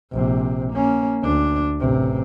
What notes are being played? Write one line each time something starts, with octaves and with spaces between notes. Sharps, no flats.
A#1 C3
A#3 C#4
D2 D4
A1 C3